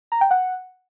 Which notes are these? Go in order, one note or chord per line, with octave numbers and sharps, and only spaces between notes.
A#5
G5
F#5